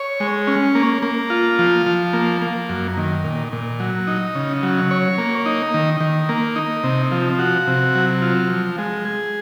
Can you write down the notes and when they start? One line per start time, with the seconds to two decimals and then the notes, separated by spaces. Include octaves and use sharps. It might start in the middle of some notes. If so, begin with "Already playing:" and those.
Already playing: C#5
0.20 G#3
0.47 C#4
0.75 A#3
1.03 A#3
1.30 F4
1.59 F3
1.86 F3
2.13 A#3
2.42 A#3
2.69 F#2
2.97 D#3
3.24 A#2
3.52 A#2
3.80 F#3
4.07 D#4
4.35 C#3
4.63 F#3
4.91 C#5
5.18 A#3
5.46 D#4
5.74 D#3
6.01 D#3
6.29 A#3
6.56 D#4
6.84 C3
7.12 F3
7.39 F#4
7.67 C3
7.95 F#3
8.22 F4
8.50 F3
8.78 G#3
9.05 G#4